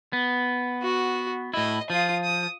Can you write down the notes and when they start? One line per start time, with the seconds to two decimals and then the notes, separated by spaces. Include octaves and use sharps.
0.13 B3
0.82 F#4
1.54 A2 E4 D#5
1.90 F3 F4 D#6
2.24 D#6